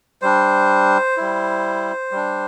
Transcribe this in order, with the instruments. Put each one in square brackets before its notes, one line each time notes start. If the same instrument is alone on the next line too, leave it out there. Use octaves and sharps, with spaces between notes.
[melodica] G3 D4 C5
G3 E4
G3 D4